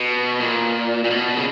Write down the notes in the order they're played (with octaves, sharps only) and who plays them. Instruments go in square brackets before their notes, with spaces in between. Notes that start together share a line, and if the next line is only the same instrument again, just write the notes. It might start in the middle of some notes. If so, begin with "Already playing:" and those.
Already playing: [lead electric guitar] B2
A#2
A#2
B2
C#3